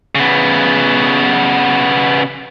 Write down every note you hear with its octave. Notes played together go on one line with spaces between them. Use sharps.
C#3 B3